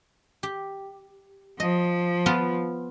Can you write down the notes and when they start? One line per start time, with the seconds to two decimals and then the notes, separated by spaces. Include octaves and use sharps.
0.43 G4
1.60 F3 D#5
2.26 B3 F4 A5